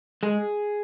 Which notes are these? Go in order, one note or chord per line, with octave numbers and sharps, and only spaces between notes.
G#3 G#4